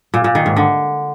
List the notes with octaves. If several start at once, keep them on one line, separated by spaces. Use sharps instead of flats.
A#2
A#2
D#3
G#2
D3